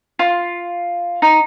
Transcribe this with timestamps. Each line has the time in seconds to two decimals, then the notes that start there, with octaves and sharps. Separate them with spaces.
0.19 F4
1.22 D#4